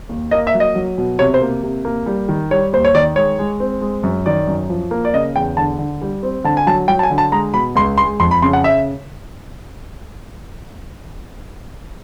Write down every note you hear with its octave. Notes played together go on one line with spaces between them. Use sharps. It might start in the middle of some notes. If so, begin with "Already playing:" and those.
D#2
A#3 D#5
E5
F#3
D#5
F#3
B2
C3 C#5
C5
A#3
C3
A#3
G3
D#3
G3 C#5
D#2 C5
C#5
D#3 D5
G#3 C#5
G#3
C4
G#3
F#2
D#3 D5
F#2
F3
A#3
D5
C#3 D#5
E2 G5
D3 A5
D3
G3
C4
D3 A5
G#5
F#3 A5
F#3 G5
A5
G#5
D3
A5
G#3 A#5
B2 B5
C#2 C6
G#3 C6
F2 C6
B5
C#3 C6
F#5
E5